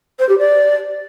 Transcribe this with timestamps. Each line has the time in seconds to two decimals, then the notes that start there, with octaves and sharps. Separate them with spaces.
0.19 C5
0.29 G4
0.38 D5